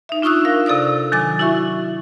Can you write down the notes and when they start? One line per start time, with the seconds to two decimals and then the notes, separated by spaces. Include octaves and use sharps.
0.09 D#4 E5
0.22 D4 F4 C#6 D#6 E6 F#6
0.45 A#4 F5
0.66 C3 A4 D5 D#6 E6
1.12 D#3 F#3 G#5 D6 A6
1.39 E4 F#4 E5 C#6